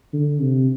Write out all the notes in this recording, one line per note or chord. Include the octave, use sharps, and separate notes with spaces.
D3
C3